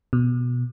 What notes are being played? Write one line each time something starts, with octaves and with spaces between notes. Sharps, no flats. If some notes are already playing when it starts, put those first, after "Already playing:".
B2